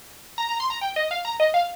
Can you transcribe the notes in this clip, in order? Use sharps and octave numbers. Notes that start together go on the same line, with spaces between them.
A#5
A#5
C6
A#5
G5
D#5
F5
A#5
D#5
F5